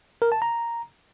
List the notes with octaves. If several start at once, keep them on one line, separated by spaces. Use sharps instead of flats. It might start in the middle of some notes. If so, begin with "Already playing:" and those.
A#4
A5
A#5